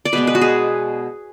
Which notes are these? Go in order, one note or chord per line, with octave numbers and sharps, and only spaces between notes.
D5
B2 G#3 B3 B4
B4
F#4
G#4